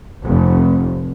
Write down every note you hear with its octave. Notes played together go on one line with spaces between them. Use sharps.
F1